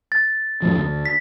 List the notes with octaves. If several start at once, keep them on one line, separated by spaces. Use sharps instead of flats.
A6
F2 A2 F3
D2
B6